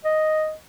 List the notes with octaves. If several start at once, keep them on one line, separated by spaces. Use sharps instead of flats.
D#5